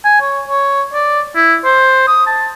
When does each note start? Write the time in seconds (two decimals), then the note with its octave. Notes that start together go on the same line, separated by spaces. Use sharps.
0.04 G#5
0.21 C#5
0.48 C#5
0.93 D5
1.36 E4
1.65 C5
2.07 D#6
2.27 A5